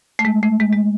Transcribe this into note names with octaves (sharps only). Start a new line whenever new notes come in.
A3
G#3
A3
G#3
G#3